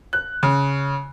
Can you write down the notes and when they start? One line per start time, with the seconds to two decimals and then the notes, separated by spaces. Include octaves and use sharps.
0.13 F#6
0.43 C#3